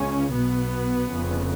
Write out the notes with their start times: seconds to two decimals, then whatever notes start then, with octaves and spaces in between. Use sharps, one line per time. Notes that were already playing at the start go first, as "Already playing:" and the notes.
Already playing: C#2 C#3 C#4
0.32 B1 B2 B3
1.10 F1 F2 C#3